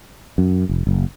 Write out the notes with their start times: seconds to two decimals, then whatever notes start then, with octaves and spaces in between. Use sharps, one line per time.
0.38 F#2
0.69 F1
0.87 F#1